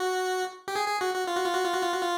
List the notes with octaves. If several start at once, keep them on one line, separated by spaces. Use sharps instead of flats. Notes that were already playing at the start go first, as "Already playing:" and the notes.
Already playing: F#4
G4
G#4
G#4
F#4
F#4
F4
F#4
F4
F#4
F4
F#4
F4
F#4
F4